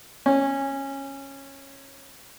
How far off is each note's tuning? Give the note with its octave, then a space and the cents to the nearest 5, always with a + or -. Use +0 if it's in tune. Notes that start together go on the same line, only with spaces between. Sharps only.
C#4 -15